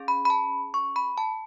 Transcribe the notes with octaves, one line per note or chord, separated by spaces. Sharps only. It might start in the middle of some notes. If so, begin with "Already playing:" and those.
Already playing: C#4 G#4
B5
B5
A5
C#6
B5
A5